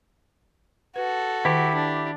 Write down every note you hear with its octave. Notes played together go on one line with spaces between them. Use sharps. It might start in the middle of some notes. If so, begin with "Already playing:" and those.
F#4 A4 B4
D#3 E4 G4
D4